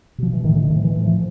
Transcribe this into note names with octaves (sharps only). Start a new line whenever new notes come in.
B2 F3
E3
A2 D#3
D3
D#3
A2
F3
E3
A2
F3